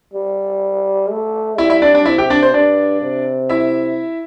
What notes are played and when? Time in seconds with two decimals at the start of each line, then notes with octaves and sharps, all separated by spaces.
0.14 G3
1.11 A3
1.58 G3 E4 E5
1.70 E4 E5
1.82 D4 D5
1.94 D4 D5
2.06 C3 E4 E5
2.18 G4 G5
2.30 D4 D5
2.43 C5
2.54 G2 D4 D5
3.02 C3
3.49 E4 E5